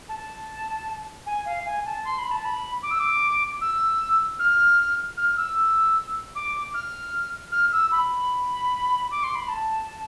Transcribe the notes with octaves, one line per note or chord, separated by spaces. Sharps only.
A5
G#5
F5
G#5
A5
C6
B5
A5
B5
D6
E6
D6
E6
F6
F6
E6
D6
F6
F6
E6
B5
D6
C6
B5
A5